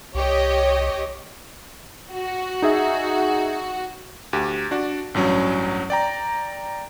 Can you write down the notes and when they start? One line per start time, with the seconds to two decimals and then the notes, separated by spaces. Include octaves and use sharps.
0.15 C2 G4 C#5 D#5
2.11 F#4
2.62 D#4 G#4 E5
4.33 D2 G4
4.71 D4 F#4 D5
5.14 A1 G2 F#3 C#4
5.90 D5 G5 A#5